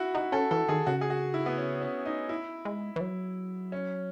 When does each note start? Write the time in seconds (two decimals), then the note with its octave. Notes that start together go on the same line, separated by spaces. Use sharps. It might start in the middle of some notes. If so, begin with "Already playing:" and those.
Already playing: E4 F#4
0.15 D#4 F#4
0.32 C#4 A4
0.51 E3 A4
0.69 D#3 G#4
0.87 C#3 F#4
1.01 G#4
1.10 F#4
1.34 E4
1.46 B3
1.58 C#4
1.81 C#4
2.06 D#4
2.29 E4
2.65 G#3
2.96 E3
3.01 F#3
3.72 C#4